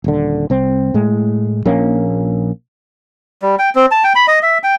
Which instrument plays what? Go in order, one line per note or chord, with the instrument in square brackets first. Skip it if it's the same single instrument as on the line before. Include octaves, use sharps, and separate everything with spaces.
[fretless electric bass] D#1 D3
C2 C4
A2 G#3
A#1 A#3 C#4
[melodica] G3
G5
C4
A5
G5
B5
D#5
E5
G5